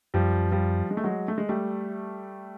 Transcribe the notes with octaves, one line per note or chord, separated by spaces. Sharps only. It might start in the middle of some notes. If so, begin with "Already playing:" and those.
F#2 F3 G3
F3 G3
G#3
A3
F#3 G#3
A3
G#3
G3 A3